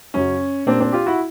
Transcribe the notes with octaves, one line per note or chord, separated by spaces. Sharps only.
F#2 C#3 F#3 C#4
A#2 G3 A#3 C4 D4
C4 D4
F4 G4
E4 F#4